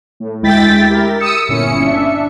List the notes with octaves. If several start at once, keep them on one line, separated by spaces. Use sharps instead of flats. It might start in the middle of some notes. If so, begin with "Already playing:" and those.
A2
D2 G#3 E4 G5 A6 B6
E4 G4 A#4
D#6 E6 C#7
G1 A#2 C#4 E4 C#7
D4 E5